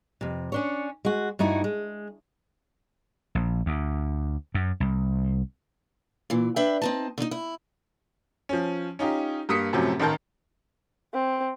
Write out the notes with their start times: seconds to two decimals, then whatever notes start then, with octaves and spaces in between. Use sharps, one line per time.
0.21 F2 C3
0.52 C#4 D4 C#5
1.05 G#3 F#4
1.39 G2 A3 D#4 E4 F#4
1.64 G#3
3.35 A#1
3.66 D2
4.55 F#2
4.80 C2
6.30 A#2 E3
6.56 D4 B4 E5 G5
6.82 C4 D#4 A5
7.18 D3 D#4
7.31 E4
8.49 F3 C#4
8.99 C#4 D#4 F4 G4
9.49 G2 A#3 D#6 B6 C#7
9.73 F#2 A2 C3 F3 F#3
10.00 A1 D#3 A#4 A5 G6
11.14 C4